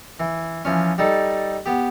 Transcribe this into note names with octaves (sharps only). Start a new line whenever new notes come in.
E3
E3 F3 C#4
G3 D#4 A4
B3 G4